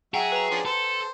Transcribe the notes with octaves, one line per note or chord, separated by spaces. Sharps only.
F#3 F#4 G#4 E5 F#5 G5 A#5
B4 A#5
F3 C#4 D4
A4 C5